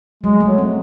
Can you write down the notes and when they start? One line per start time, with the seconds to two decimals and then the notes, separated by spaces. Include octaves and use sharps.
0.24 F#3 G#3
0.40 A3
0.46 F#3
0.58 C4